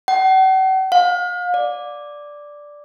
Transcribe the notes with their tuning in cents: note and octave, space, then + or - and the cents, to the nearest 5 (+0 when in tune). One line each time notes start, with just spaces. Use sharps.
F#5 +45
F5 +40
D5 +0